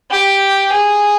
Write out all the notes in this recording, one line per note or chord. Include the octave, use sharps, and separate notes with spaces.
G4
G#4